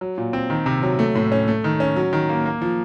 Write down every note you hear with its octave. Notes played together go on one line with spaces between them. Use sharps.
F#3
A#2
C4
D#3
C3
F#3
A3
A2
C#4
A3
D#3
C#4
F#3
D#3
A#3
A#3
F3